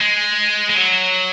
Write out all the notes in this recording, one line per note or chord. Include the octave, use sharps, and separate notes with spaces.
G#3
G#3
F#3